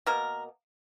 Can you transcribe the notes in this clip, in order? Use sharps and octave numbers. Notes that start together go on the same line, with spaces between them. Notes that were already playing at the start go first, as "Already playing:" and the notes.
B2 A#3 A#4